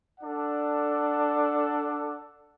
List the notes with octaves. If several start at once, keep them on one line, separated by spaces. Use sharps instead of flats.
D4 A4 D5 F#5